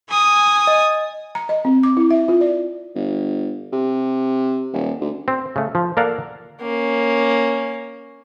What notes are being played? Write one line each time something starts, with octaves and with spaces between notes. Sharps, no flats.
G#5 D#6
D#5
A#5
D#5
C4
D6
E4
E5
F4
D5
G1
C3
D#1
D2
C4
C#3 A3
F3
A#3 A4 A#4 D5 F5 F#5
A#3 C#4